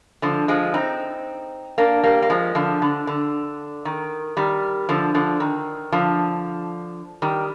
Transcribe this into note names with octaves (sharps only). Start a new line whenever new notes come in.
D3 F3
F3 G#3
C4 D#4
A#3 D4
G3 A#3
A#3
F3 G#3
D3 F3
D3
D3
D#3
D#3 G3
D3 F3
D3 F3
D#3
D3 F3
D#3 G3